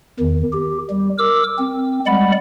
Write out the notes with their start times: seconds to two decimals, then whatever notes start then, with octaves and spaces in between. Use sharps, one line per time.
0.20 E2 D#3
0.52 G4
0.90 G3
1.19 A#4 D6 E6
1.59 C4
2.07 G3 G#3 D5 F#5 B5